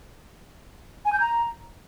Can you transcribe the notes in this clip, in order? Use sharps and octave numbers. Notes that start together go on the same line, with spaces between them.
G#5
G6
A#5